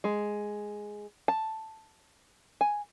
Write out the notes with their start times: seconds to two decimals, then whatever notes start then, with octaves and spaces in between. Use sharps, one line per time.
0.04 G#3
1.28 A5
2.61 G#5